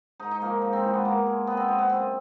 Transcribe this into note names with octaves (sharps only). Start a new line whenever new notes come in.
G#2 D#4
D#4
F3 G#3 A#3
G#2
C4
E3 G#3
B3
B2 A#3
G#3
C3 B3
C4
F3 G#3 B3
B3
F#2 C4